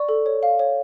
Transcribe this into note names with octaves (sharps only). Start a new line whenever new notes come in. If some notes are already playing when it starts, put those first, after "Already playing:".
Already playing: D5 C#6
A4
C#5
F5
C#5